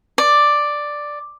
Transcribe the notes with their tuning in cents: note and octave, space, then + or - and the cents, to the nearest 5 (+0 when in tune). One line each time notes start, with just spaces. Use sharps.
D5 +5